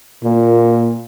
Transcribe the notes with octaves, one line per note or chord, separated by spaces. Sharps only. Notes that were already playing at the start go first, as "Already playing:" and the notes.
A#2